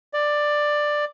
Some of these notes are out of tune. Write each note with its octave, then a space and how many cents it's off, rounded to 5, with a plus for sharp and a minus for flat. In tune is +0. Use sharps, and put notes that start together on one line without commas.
D5 +10